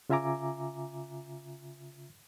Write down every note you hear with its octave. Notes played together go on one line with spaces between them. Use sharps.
C#3 F4 E5 G#5 A#5 D6